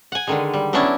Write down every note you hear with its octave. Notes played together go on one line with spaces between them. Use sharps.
F#5 G#5
D3 D#3 G#3
G3
F#3 B3 C#4 D4 E4